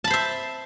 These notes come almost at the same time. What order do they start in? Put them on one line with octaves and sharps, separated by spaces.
A5 B5 C5 E5